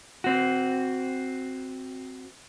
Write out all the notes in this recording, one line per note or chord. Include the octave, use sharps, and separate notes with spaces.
C4 F#4